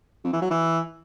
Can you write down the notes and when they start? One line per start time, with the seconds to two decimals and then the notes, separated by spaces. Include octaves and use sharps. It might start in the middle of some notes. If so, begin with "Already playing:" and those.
0.24 F2
0.33 E3
0.42 F#3
0.50 E3